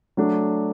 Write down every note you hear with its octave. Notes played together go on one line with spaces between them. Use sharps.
F#3 A3 D4